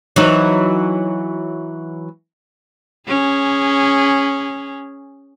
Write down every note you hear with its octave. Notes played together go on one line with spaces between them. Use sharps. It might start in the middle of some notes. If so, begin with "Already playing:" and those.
E3 F#3 D#4
C#4 G#4